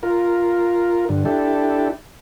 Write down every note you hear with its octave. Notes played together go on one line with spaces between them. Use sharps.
F4 A#4
G2 D3
D4 E4 G4 A4